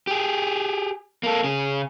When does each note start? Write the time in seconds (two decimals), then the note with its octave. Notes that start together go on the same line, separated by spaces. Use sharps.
0.07 G4 G#4
1.23 A#3 A4
1.44 C#3 G#4